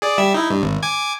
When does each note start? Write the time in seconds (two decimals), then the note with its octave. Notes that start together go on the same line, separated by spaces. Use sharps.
0.02 G#4 D5
0.18 G3 E5 E6
0.34 D#4 E4
0.50 G2
0.62 G#1
0.83 G#5 D6 G#6